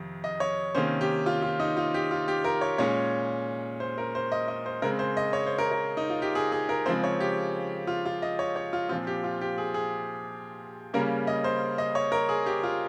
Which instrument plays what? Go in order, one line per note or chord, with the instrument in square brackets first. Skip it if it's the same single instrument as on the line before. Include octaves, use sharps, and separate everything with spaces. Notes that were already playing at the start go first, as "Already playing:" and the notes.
Already playing: [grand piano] F2 C3 D#3
D#5
C#5
C3 D#3 A#3 C#4 C5
G4
F4
F4
D#4
F4
G4
F4
G4
A#4
C#5
A#2 G#3 C#4 C#5
C5
A#4
C5
D#5
D#5
C5
C#3 G#3 C4 A#4
C5
D#5
C#5
C5
A#4
A#4
D#4
F4
G4
G#4
G#4
A#4
C#3 F3 G#3 C4 C5
C#5
G4
F4
F4
D#5
C#5
C#5
F4
A#2 F3 C4 F4
G4
F4
G4
G#4
G#4
C#3 G3 A#3 C#4 A#4
D#5
C5
D#5
C#5
A#4
G#4
G4
F4